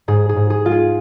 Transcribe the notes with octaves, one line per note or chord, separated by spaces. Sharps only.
G#2 G#4
G#4
G#2
G#4
G#3 F4
G#4